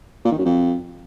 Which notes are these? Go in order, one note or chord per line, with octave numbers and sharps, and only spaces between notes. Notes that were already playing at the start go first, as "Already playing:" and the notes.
A#2
D#3
F#2
F2